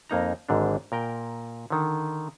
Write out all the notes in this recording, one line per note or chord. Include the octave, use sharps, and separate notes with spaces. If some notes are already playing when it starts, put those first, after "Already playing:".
F2 A#3 D#4 A#5
G#1 G#2 D3 D4
A#2 A#4 G5
D3 D#3